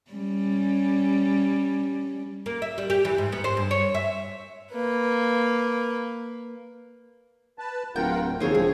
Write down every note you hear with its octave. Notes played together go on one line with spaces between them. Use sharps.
G3 C#4
A#3
E5
G3
G4
E3
G#2
B3
C5
G2
C#5
E5
A#3 B4
B4 A5
D1 F4 A#4 F#5 G5
A2 C3
D#2 C#3 F3 C4 G#4 C#5
E1 G#4